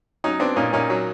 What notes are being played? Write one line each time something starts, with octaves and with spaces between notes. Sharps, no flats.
F#3 C#4 D#4
B3 C4 D4
A#2 C#4 D#4
A#2 C#4 D#4
F#3